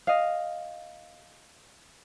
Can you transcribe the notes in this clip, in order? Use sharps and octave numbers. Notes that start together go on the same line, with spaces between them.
D#5 F5